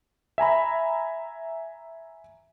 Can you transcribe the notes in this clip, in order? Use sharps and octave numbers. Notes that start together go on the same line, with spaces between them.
E5 G#5 A#5 B5